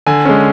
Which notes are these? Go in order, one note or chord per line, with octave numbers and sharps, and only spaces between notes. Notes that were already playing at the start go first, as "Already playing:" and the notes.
D3 G#5
G#3 C#4